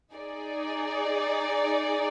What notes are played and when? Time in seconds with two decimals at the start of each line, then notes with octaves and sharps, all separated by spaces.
0.14 D#4 G#4 D5